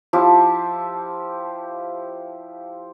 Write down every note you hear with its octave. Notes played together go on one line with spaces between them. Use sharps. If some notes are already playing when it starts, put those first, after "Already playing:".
F3 E4 F4 G4